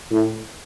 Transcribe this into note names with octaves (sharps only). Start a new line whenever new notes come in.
A2